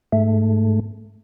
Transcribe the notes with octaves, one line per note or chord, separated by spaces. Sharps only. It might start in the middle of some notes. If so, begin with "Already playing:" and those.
G#2 A3